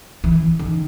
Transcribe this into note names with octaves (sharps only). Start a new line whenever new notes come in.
E3
D#3